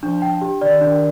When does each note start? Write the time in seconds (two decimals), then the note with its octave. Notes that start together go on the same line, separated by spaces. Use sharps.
0.03 F3 D4
0.22 G5
0.41 G4
0.61 D#3 D5
0.81 D4